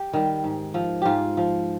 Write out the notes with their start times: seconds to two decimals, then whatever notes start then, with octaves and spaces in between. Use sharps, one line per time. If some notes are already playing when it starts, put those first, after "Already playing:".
Already playing: G4
0.13 D#3 G3
0.44 G#2
0.74 F3
1.02 G#2 F4 G4
1.37 F3